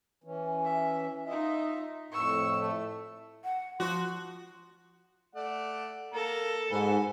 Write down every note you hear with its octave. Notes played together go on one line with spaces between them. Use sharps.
E3 C#4
E5
D#4 F4 D#5 E5
F2 A2 C#6 E6
A3
F#5
F3 F#4 C6
A3 D5 F#5
A#3 A4 A#5
G#2 F#4 B4 G#5